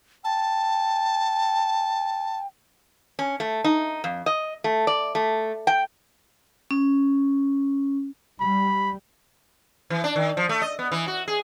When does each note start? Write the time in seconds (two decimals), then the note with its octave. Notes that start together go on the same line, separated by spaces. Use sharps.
0.24 G5 A5
3.19 C#4
3.40 A3
3.64 D#4
4.04 F2
4.26 D#5
4.64 A3
4.87 D5
5.15 A3
5.67 G5
6.71 C#4
8.41 G3 B5
9.90 E3
10.04 D4
10.16 D#3
10.37 F3
10.49 A3
10.62 D#5
10.79 B3
10.92 E3
11.07 F#4
11.28 G#4